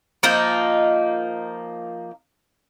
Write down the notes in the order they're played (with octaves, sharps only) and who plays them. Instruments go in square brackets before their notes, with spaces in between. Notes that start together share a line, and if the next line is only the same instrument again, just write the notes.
[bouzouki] F3 A#3 D#4